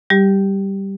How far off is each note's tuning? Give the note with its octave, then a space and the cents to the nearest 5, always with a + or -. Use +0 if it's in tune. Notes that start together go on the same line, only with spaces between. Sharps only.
G3 -5 G4 +0